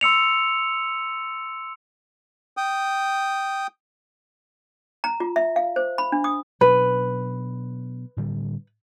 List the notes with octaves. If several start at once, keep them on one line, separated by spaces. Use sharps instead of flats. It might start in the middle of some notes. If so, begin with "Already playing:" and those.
C6 E6 C#7 F7
G5 D#6
A#5
F4
E5
F5
C5
B5
D4
D#6
B2 F#3 D4 B4
A2 D3 G3